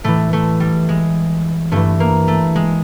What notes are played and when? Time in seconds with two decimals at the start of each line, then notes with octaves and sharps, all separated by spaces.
0.04 A2 E3 A3
0.33 A3
0.60 G3
0.89 G#3
1.72 G2 E3 A3
2.00 A#3
2.28 A3
2.56 G#3